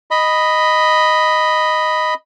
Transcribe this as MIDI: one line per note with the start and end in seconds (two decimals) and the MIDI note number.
0.11 2.14 75
0.11 2.14 83